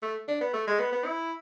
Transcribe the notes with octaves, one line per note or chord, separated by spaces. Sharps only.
A3
D4
B3
A3
G#3
B3
B3
E4